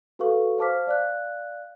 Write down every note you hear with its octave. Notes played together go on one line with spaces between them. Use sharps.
F#4 A4 B4 F5 C#6
C5 F5 A5 D6 F6 B6
D5 F5 F#6